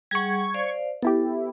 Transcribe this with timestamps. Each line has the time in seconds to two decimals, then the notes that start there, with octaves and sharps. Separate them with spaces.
0.11 G3 G#4 F#5 C#6 G#6
0.54 C5 D5 F5
1.03 B3 E4 G4 A4